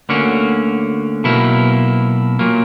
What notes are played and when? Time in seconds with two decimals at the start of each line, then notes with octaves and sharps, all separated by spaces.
0.09 D2 D3 A#3 C#4 F#4
1.24 B1 B2 A#3 E4
2.39 A#2 F#3 A#3